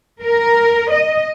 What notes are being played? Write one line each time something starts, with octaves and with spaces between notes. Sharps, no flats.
A#4
D#5